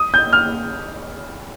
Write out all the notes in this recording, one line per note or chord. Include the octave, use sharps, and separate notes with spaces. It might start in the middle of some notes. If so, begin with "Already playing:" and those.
Already playing: D#6
G6
F6